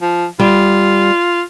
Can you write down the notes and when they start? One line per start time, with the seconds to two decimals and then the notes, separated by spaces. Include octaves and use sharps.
0.02 F3
0.39 G3 F4